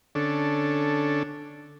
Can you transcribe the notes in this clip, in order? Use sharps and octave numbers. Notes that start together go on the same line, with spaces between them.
D3 C#4 D4 A4